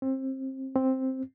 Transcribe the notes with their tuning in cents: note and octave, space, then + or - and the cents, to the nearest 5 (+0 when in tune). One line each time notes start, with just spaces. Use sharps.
C4 +25
C4 +5